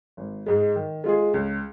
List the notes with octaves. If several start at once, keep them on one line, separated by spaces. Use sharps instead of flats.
G#1
G#2 G#3
D#3
G#3 F4 G#4
C#2